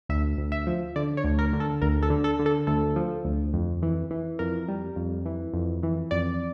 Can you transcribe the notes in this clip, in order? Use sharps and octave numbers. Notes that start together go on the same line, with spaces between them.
D2 E5
D2
E5
F3
D3 D5
C#5
D2
A#4
D3
A4
D2 A#4
A4
D3
A4
D3
A4
D2 A4
F3
D2
F2
E3
E3
F2 A#4
G3
F2
E3
F2
E3
F2 D5